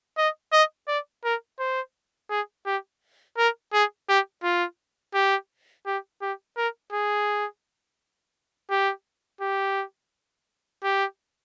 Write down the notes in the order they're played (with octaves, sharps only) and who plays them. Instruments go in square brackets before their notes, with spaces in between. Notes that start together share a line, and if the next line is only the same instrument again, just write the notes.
[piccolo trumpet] D#5
D#5
D5
A#4
C5
G#4
G4
A#4
G#4
G4
F4
G4
G4
G4
A#4
G#4
G4
G4
G4